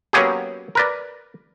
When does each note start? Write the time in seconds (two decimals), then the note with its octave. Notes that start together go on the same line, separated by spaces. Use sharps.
0.13 F#3 A#3 B3 C#4 G4 G#4
0.75 A#4 B4 D5